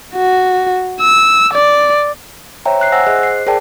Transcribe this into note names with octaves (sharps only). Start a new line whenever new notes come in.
F#4
E6
D5
C5 C#5 E5 G5 A#5
E5 F#6 C7
C5 F#5 G#5 E6 A#6
G#4 C5 D#5 F#6
C7
G#4 A#4 C5 D5 G5 A5